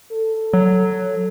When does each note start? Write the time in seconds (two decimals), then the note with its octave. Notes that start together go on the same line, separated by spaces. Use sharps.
0.12 A4
0.53 F#3